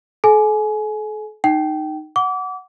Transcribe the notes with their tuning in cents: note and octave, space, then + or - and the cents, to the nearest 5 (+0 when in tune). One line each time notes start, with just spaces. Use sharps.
A4 -40 G#5 +25
D#4 -10 G5 -20
F#5 +0 D6 -30